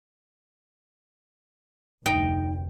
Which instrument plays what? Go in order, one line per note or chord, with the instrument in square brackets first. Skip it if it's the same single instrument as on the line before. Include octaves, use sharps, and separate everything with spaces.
[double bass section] F1 D2 [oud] D#4 [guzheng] G5